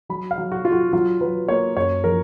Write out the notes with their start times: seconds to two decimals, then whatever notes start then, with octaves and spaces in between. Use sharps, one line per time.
0.09 F#3 B5
0.31 F5
0.38 F#3
0.52 F#4
0.65 F#3 F4
0.72 F#4
0.93 F#3 F4
1.21 F#3 B4
1.48 A#3 C#5
1.76 F#2 C#5
2.04 F3 A#4